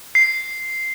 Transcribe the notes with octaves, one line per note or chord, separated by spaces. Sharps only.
C7